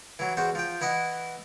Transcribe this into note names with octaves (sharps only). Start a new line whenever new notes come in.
E3 F#3
E2 F#4 C5
F3 G5
E3 E4 D#5 F#5